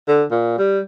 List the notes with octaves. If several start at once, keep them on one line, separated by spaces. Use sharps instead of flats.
D3
A#2
G3